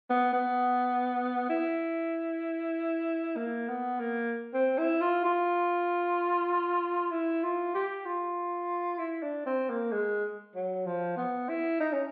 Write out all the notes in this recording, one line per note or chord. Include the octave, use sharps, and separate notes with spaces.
B3
B3
E4
A#3
B3
A#3
C4
E4
F4
F4
E4
F4
G4
F4
E4
D4
C4
A#3
G#3
F#3
F3
B3
E4
D#4
C#4